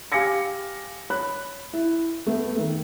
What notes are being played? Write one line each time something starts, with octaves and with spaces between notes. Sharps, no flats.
G4 F5 G#5 D6 A#6 C#7
C#5 B5 F#6
E4
A3 B3
D#3 A3